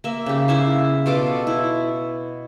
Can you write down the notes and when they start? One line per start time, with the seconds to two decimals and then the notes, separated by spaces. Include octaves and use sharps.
0.04 A#3 E5
0.26 C#3 G4
0.48 E4 E5 F5
1.06 B2 F4 A4 D6
1.47 E4